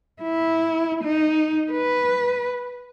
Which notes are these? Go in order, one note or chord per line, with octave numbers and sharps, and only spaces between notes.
E4
D#4
B4